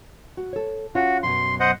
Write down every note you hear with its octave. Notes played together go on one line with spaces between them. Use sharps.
F#4
A4 C#5
C#4 F4 F#4
F#2 B2 F#3 C6
C5 D#5 F#5